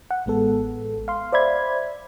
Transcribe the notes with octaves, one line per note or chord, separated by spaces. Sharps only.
F#5
A1 G#3 B3 A4
F5 C6
C5 D5 E5 B5 G#6